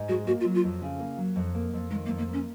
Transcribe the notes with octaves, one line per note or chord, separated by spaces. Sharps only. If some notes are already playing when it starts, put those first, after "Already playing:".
Already playing: G#2
G#3 F#4
A#3 F#4
F4
F#3
F4
F2
C#3
A#3
F#3
F2
A#3
F2
D#3 G#3
A#3
F2
A#3
A#3 C#4